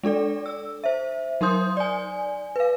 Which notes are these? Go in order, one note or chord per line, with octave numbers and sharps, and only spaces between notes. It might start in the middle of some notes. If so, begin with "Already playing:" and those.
G#3 D4 A4 D5
E6
C5 E5
F#3 D#4 A#4 C6 D#6 G6
D5 G#5
B4 F5